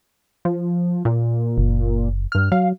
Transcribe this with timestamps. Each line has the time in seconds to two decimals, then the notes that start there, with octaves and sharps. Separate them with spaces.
0.45 F3
1.05 A#2
1.58 F#1
2.32 G2 F6
2.52 F#3 F5